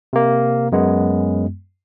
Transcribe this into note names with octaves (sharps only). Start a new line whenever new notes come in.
C3 A#3
F#2 G#3 B3